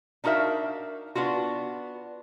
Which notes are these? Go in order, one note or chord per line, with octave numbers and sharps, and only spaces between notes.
D4 D#4 F#4 A#4 E5 F5
B3 D4 F4 F#4